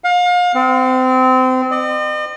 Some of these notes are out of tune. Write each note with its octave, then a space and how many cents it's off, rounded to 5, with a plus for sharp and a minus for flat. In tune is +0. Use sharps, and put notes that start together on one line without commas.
F5 +35
C4 -25
D#5 -45